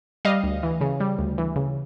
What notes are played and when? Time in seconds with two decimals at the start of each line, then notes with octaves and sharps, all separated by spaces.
0.25 G3 D#5 F5
0.44 D2
0.63 E3
0.81 C#3
1.00 G3
1.19 D2
1.38 E3
1.56 C#3